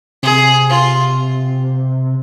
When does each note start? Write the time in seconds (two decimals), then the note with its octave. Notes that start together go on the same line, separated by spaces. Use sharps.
0.23 C3 G#4
0.69 F4